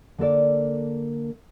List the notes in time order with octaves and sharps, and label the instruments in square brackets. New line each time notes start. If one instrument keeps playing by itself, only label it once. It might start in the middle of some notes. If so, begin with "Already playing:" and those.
[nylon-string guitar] D3 A#3 A4 D5